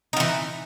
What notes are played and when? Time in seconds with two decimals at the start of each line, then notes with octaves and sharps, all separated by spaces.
0.13 D#4
0.17 F3
0.20 E3